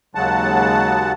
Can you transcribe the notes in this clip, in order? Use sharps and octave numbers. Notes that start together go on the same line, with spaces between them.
D#2 C#3 F#3 G#3 F#5 A5